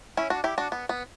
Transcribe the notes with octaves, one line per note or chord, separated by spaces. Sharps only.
C#4 E4
D4 F#4
E4 G4
D4 F#4
B3
B3